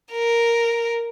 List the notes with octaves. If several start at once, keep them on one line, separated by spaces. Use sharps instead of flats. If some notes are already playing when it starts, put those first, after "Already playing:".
A#4